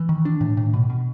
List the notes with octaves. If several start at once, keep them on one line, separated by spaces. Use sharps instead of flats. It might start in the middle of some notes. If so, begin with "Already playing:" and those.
Already playing: E3
D#3
D4
A2
A2
B2
B2